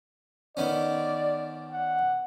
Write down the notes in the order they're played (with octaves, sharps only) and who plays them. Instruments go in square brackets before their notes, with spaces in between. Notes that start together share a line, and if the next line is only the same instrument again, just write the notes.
[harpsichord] D#3 B3 C#4 [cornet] D5
[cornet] F#5